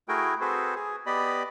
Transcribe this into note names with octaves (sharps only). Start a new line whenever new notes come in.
A3 E4 F#4 G#4 A#4 G5
C4 F#4 G#4 A4 B4 C5
G#4
B3 G4 D5 D#5 B5